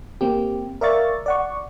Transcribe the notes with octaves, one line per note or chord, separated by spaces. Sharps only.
A#3 C4 G4
A#4 D5 E5 F5 C#6 A6
D5 F#5 C#6